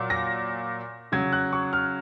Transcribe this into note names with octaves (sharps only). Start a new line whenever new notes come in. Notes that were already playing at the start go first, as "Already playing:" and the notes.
Already playing: A#2 F#3
A#6
C#3 F#3 G#6
F#6
C#6
F6